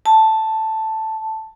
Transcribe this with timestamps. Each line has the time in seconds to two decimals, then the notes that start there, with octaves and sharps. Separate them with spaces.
0.06 A5